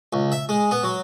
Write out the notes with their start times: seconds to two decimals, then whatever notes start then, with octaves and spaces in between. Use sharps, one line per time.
0.13 C#2
0.32 E5
0.49 G#3
0.71 B3
0.83 F#3